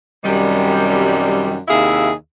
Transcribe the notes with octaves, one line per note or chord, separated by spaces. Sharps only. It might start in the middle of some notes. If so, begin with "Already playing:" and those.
F#2 C3 D#3 G3
D#2 C3 E4 G#4 E5 F5